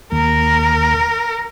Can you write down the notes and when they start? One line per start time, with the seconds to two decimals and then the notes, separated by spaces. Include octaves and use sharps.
0.12 D#2 A#4